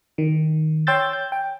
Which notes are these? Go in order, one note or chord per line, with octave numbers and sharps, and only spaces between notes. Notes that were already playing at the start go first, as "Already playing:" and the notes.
D#3
C#5 G5 C6 E6 G6 A6
G6
G5